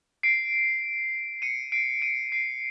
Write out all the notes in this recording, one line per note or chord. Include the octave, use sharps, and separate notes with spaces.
C7 D7
C#7 D#7
C7 D7
C#7 D#7
C7 D7